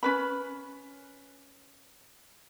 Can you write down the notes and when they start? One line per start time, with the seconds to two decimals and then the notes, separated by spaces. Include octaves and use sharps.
0.03 C#4 B4 B5